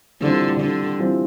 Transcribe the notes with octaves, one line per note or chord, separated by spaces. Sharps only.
D3 E3 G3 C4 F4
D3
E3 G3 C4 F4